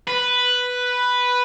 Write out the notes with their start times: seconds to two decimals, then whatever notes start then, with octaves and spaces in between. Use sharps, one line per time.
0.08 B4